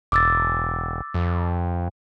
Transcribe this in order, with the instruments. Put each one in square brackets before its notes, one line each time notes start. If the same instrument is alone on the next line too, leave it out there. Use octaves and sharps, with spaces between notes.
[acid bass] E1 [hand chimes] D6 E6 A6
[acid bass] F2